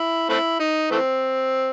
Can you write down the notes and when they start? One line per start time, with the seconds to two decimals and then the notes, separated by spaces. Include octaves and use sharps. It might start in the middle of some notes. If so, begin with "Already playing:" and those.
Already playing: E4
0.29 A3 C4 E4
0.60 D#4
0.91 E3 A3 C4